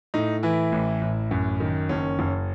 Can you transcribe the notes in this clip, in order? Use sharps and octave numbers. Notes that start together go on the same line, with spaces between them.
A2 D#4
E3 E4
A1
A1
F#2
D#3
F#1 C#4
F#1